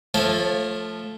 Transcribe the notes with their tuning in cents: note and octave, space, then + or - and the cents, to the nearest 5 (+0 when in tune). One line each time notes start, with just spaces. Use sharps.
F3 +0 A3 +0 C#5 -35